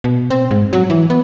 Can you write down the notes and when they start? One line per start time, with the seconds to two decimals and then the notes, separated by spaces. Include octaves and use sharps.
0.04 B2
0.30 C4
0.51 G#2
0.73 F#3
0.90 E3
1.10 B3